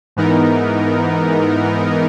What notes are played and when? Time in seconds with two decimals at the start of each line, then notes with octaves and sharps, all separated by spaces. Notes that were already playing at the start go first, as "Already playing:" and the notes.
0.16 G#2 E3 B3 D#4 A#4